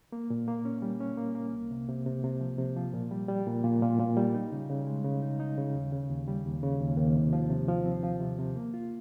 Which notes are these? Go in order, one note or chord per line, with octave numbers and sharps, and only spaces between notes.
A#3
A#2
A#3
C#4
G3
C#4
A#3
A#3
C2
C3
C3
C3
C3
F3
C3
F3
A#2
G3
G3
A#2
A#2
A#2
A#2
G3
D#4
C#3
C#3
G#3
C#3
D#4
D#4
C#3
D#2
C#3
D#2
G3
D#2
C#3
D#2
D#2
C3
F3
C3
F3
C4
F3
C3
C3
A#3
F4